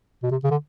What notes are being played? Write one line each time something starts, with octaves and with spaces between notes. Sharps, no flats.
B2
C3
C#3
D3